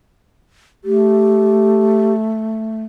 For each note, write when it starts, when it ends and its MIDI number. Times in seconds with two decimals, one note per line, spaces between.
0.85 2.83 57
0.85 2.14 67